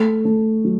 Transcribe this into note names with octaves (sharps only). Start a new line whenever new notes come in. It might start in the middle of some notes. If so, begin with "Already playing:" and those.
Already playing: A3
A3
F#3